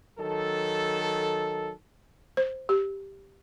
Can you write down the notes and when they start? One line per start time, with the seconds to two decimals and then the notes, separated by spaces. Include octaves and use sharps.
0.19 D#3 F#3 A4
2.37 C5
2.69 G4